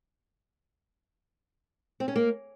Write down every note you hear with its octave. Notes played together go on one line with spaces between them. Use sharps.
C4
C#4
A#3